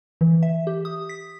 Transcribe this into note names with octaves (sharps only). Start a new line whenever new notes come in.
E3
E5
G4
D#6
B6